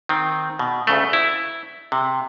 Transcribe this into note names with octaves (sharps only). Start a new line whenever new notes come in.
D#3 C4
B2
D2 C#3 A3
E4
C3